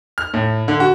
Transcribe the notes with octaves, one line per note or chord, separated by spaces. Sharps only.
F6
A2
D3
F#4